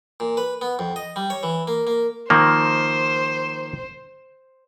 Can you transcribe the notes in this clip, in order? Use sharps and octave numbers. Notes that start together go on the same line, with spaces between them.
A#2
B4
B3
F2
D#5
G3
C#5
E3
A#3
A#3
D#3 F3 A#3 C5